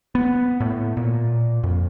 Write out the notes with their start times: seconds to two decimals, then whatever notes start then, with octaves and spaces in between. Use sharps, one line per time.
0.15 B3
0.60 A2
0.97 A#2
1.63 F2